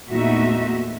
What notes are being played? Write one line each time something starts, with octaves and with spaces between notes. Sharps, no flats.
E2 A#2 A3 D#4 F#4 E5